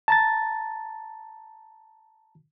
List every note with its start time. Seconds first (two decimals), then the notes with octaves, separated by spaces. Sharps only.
0.08 A5 A#5 A6